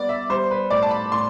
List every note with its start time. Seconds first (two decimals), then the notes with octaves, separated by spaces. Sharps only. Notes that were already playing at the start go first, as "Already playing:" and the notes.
Already playing: G3 B3 D5
0.09 E5
0.30 G3 C5
0.51 B4
0.70 A2 D5
0.83 A5
0.91 B5
1.12 A2 C6